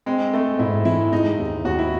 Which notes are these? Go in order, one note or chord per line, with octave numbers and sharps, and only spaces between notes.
G#3 C4
A3 C4
G#2 E4
E3 E4
G#3 D#4
D#2
D#2 F#4
E4